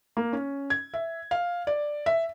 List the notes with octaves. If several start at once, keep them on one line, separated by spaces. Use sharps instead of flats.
A#3
C#4
G#6
E5
F5
D5
E5